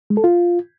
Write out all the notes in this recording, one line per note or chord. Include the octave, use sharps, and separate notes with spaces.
G#3
A4
F4